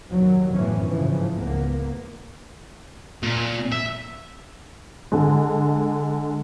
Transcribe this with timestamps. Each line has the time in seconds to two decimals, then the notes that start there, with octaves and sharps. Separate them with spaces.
0.11 D#2 F#3 G3
0.52 G1 F#2 A2 E3 F3 C#4
0.87 G#2 C#3 E3 F3
1.38 C#2 A#3 B3
3.23 A#2
3.72 E5
5.12 D3 G#3